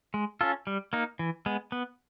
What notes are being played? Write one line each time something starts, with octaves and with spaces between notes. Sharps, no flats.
G#3
C#4 F4 A4
G3
A#3 D#4
E3
G#3 B3
B3